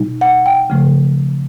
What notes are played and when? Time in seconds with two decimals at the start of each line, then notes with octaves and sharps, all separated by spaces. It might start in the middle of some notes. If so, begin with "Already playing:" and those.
Already playing: B2 G3 D#4
0.21 F#5
0.46 G5
0.70 C#3 F3 A3